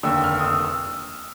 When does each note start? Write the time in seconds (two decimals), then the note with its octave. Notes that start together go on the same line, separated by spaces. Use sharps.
0.03 F1 D#2 D3 E6
0.16 E6
0.24 F6
0.39 D#6
0.44 E6
0.65 E6